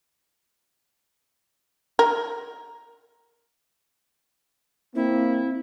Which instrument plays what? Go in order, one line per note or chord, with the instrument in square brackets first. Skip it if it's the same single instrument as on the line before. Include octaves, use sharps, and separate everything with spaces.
[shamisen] A#4
[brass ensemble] A#3 C4 [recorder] E4